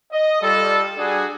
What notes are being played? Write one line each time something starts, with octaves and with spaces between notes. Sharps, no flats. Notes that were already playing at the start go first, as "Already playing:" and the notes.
D#5
G3 F4 A4
G3 D4 F#4 G#4